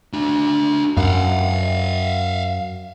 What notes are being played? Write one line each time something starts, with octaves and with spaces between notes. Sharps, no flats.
D4 F#4
F#2 F5 F#5